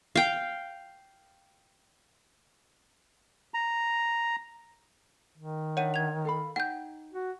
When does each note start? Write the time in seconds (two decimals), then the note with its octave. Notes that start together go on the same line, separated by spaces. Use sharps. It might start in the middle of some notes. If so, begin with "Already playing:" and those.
0.16 F5 G5
3.54 A#5
5.37 D#3
5.77 D4 C#5 E5 F#5 D#7
5.94 G#6 F7
6.25 A4 F5 B5
6.56 D#4 C#5 F#5 G5 G6
7.13 F#4